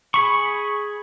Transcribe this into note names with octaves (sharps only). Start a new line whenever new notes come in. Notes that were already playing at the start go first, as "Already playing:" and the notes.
G#4 B5 C#6